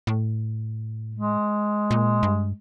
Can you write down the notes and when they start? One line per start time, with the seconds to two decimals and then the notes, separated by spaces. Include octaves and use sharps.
0.07 A2
1.15 G#3
1.91 A#2
2.23 G2